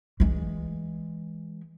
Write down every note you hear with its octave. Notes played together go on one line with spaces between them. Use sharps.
E3 G#3